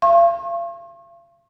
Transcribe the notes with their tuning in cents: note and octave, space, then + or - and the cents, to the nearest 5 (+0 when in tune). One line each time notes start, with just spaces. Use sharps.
F5 -40 C#6 -45